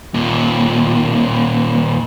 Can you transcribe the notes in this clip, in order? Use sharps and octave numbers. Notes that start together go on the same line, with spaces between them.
D#2 A#2